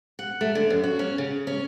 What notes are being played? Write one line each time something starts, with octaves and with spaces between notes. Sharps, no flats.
F#5
A3
D3
F#2
F#4
C#4
C#3
C#4